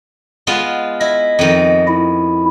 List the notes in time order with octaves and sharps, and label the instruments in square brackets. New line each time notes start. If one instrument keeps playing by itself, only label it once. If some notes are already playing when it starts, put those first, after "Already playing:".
[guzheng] G#3 B3 F4
[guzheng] E4 [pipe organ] D#5
[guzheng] F2 D#3
[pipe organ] E4